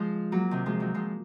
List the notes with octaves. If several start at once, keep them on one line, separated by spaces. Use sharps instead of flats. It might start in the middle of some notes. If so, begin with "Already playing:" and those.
Already playing: F3 G#3
F#3 A#3
C3 D#3
F3 G#3
D#3 F#3
F3 G#3